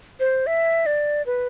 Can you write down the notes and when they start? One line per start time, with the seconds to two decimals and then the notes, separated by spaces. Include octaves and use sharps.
0.20 C5
0.47 E5
0.86 D5
1.26 B4